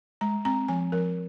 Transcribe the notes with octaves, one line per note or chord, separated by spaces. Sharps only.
G#3 A#5
C4 A#5
F3 G#5
F3 A#4